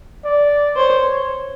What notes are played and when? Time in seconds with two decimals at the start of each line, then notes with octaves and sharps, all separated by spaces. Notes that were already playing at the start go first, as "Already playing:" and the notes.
0.24 D5
0.77 C5 C#5